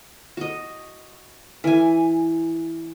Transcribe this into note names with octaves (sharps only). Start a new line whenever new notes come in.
F#4 D#5
E3 G#5